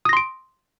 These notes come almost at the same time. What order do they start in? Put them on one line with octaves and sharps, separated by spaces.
D#6 A#6 C6 D7